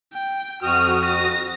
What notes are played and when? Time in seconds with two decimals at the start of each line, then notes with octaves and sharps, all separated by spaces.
0.13 G5
0.63 F2 F#4 D#6 F6
1.06 A#6